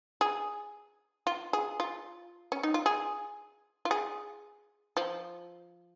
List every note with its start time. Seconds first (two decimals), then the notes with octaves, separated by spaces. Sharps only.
0.21 G#4
1.27 F4
1.53 G#4
1.80 F4
2.52 C#4
2.63 D#4
2.74 F4
2.86 G#4
3.85 F4
3.91 G#4
4.97 F3